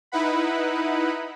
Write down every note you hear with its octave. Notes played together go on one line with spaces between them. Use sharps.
D#4 E4 B4 F#5 B5